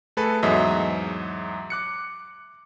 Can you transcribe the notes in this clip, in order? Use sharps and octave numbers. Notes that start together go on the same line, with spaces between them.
A3 G#4 A4 B4
E2 G#2 F#3 D#5 E5
D6 F#6 C#7